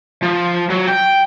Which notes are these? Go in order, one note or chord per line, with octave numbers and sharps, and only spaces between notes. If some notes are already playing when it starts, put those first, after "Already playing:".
F3
F#3
G5